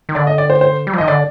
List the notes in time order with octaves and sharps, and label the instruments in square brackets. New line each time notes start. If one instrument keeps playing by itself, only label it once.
[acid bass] D#3
[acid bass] D3 [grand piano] D5
[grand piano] D#5
D5
C5
C5
[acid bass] G3
F3
[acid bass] D#3 [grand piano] D#5
[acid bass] D3 [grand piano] D5